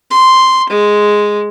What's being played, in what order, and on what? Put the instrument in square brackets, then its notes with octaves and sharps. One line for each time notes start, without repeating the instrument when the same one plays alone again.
[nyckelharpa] C6
G#3